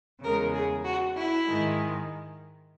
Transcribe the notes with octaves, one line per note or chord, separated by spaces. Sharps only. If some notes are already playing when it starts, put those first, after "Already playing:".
E2 C#3 G#3 A#4
G#4
F#4
E4
G#2 D#3 G#3